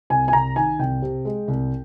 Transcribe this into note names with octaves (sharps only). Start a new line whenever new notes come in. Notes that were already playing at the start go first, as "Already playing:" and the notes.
C2 G#5
G#5
C2 A#5
D#3 G#5
C2 G5
C3
G#3
C2